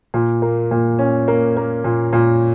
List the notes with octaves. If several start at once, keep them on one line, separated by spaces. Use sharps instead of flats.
A#2
A#3
A#2
C#4
A#3
A#3
A#2
A#2